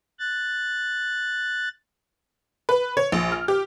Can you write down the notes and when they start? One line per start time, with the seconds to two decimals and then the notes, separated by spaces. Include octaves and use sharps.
0.19 F#6 A6
2.69 B4
2.97 C#5
3.12 A#1
3.32 F6
3.48 G4